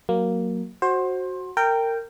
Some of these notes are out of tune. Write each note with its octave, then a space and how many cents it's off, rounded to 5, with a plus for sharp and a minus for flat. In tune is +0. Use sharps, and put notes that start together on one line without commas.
F#3 +0 A#3 +0
F#4 +0 C5 +20
A#4 -25 G5 +0